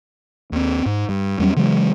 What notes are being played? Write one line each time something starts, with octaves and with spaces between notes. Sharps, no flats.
D#2 C4
G#2
G2
E2 F#3 G3 C#4
C#3 E3 F#3 G#3